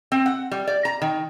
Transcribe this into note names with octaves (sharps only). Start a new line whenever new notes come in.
C4
F#5
G3
D5
A#5
D#3